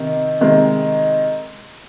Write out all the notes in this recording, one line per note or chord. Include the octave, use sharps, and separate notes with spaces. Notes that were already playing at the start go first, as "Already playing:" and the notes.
Already playing: C3 D#3
C3 D#3 G#3